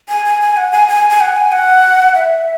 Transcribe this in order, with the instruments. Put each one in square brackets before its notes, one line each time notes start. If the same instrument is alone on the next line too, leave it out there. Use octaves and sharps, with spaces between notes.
[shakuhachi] G#5
G#5
G#5
F#5
G#5
G#5
G#5
F#5
G#5
F#5
E5